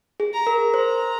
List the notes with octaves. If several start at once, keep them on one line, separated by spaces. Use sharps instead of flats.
G#4
A#5
A#4
C5 A#5